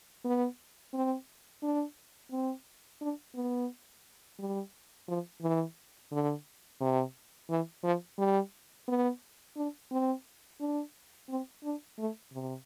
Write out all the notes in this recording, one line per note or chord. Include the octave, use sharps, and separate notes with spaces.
B3
C4
D4
C4
D4
B3
G3
F3
E3
D3
C3
E3
F3
G3
B3
D4
C4
D4
C4
D4
A3
C3